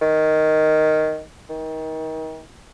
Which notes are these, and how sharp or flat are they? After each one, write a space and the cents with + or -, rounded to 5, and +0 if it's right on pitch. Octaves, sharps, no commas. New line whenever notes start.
D#3 +0
D#3 +30